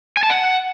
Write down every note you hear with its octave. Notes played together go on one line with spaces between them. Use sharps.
G#5
A5
F#5